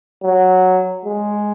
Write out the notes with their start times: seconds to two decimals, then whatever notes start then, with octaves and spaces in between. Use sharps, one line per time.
0.23 F#3
1.05 G#3